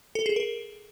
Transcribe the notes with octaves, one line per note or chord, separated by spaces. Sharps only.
A4
G#4
A#4